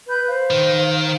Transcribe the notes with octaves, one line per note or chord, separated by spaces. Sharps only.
B4 B5 G6
C5 F5
D#3